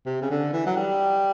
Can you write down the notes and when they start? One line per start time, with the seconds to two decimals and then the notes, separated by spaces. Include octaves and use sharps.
0.06 C3
0.22 C#3
0.30 D3
0.53 E3
0.66 F#3
0.76 G3